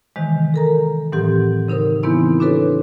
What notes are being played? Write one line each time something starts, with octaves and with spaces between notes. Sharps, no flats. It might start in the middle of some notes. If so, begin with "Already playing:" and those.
C3 D#3 E3 G#3
A4 A#4 A#5
A2 E3 F#3 C4 G4
C#3 D#4 A#4 C5
E3 G#3 B3 C4 D#4 E4
D4 F#4 A4 B4 C#5